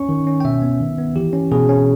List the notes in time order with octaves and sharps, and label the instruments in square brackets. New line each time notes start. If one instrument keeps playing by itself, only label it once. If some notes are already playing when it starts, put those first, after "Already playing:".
Already playing: [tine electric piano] C#4 C#6
D#3
C#4
G5
B2 E5
B3
D#3
B3
E3 G4
C#4
B2 G#4
C#4